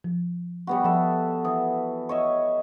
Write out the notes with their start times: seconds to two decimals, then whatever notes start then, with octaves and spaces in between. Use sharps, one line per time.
0.04 F3
0.67 G3 B3 F#4
0.84 F3 A4 E5
1.45 E3 D#6
2.09 C#5 D#5 E5